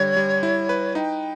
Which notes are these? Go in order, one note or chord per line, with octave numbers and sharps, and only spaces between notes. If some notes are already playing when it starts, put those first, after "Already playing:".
Already playing: D3 G3 C#5
G3
E4
B4
D#4 G5